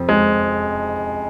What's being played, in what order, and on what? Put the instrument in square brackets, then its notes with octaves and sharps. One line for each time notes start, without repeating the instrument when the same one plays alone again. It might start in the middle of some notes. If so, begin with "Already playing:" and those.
Already playing: [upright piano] F2 C3 C4 [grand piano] F3
[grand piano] G#3